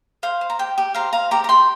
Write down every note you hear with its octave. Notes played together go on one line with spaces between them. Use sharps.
C5 F5
C5
A#5
G4 G5
G4
C5 F5 A#5
C5 F5 A#5
G4 A#5 D6
A#5
G4 G5 C6